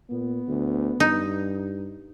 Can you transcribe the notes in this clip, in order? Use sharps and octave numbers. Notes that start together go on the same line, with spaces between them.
A#2 B3
D2
G2 D#4